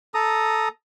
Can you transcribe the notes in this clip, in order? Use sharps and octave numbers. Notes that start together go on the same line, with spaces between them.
A4 A#5 D#6